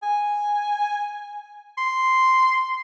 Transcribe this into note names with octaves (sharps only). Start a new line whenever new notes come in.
G#5
C6